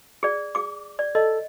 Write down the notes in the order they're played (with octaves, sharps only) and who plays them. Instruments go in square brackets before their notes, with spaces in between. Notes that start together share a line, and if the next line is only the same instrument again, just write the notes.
[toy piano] G#4 D5
G#4 D6
D5
[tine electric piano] A4 [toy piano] D#5